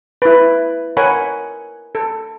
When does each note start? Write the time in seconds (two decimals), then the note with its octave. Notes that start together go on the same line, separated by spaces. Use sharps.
0.22 E4 B4
0.97 A#4 C#5 F#5 G#5 B5
1.95 A4